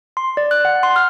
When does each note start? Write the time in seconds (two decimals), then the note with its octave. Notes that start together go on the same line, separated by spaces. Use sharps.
0.17 C6
0.37 D5
0.51 F#6
0.65 F#5
0.83 C6
0.96 F6